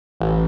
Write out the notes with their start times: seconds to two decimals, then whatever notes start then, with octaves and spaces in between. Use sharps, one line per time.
0.21 A1